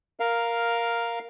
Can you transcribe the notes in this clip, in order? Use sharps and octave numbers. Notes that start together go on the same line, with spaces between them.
A#4 F5